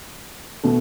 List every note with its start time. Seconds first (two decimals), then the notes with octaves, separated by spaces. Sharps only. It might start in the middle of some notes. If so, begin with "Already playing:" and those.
0.63 B2 A3